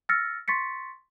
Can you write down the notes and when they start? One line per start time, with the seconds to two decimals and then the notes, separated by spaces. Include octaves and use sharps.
0.09 E6 F6 A6 A#6 C#7
0.48 C6 C#6 A6 B6 C#7